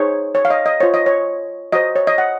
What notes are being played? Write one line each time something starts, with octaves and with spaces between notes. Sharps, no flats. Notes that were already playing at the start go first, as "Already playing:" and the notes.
Already playing: D#4 G#4 C5 C#5
C#5
F5
D#5
D#5
F4 C5 C#5
D#5
C#5
F#4 C5 D#5
C#5
D#5
F#5